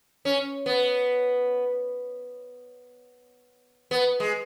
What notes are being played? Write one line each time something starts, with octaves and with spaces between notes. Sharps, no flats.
C#4
B3
B3
G#3